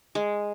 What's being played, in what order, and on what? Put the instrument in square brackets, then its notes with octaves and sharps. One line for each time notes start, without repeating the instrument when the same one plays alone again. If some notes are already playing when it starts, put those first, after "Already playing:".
[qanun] G#3